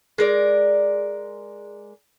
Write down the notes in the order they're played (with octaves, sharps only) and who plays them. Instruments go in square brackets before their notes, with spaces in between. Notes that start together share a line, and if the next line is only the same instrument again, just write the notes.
[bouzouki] G#3 A#4 D5